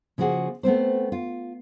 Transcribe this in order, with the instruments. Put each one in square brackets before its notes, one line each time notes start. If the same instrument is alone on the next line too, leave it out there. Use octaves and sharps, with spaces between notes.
[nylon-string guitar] C#3 F3 A#3 F#4 G#4
A3 B3 C4 C5
F4